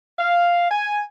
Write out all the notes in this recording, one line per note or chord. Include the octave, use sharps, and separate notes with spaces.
F5
G#5